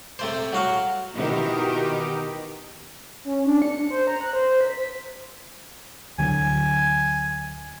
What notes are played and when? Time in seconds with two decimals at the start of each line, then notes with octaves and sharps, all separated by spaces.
0.19 C3 A3 C5
0.53 F#3 F#4 F5
1.16 B2 D#3 E3 D#4 G4 A#4
3.25 C#4
3.46 D4
3.62 C#7
3.91 C5
4.07 A#5
4.21 F#6
4.33 C5
4.61 B6
6.18 D2 D3 F#3 G#5